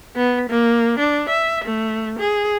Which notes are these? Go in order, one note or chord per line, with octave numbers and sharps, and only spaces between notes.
B3
A#3
D4
E5
A3
G#4